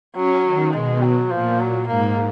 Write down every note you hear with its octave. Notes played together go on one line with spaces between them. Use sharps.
F#3 C#4
D#3
B2 G#3
F#3
A#2 F3
F#3
G#2 A#3